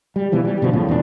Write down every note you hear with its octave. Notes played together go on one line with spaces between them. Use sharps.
G3
B2 E3 F3 G3
G3
G2 B2 D3 F3
D#1 A2 C#3 F3
E1 E2 E3 D4